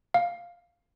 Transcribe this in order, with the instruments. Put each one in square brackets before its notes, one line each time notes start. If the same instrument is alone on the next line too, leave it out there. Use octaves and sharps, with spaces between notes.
[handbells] F5